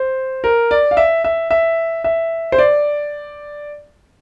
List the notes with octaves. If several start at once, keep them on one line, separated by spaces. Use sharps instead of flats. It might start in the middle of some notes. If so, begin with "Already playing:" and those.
Already playing: C5
A#4
D5
F5
E5
E5
E5
E5
C5
D5